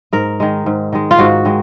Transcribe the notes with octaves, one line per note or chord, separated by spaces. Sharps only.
G#2 A#4
D#3 G#3
G#2
D#3 G#3
F4
G#2 F#4
D#3 G#3